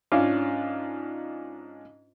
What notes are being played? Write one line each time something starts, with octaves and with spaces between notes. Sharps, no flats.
G#2 C#4 D4 F4 D6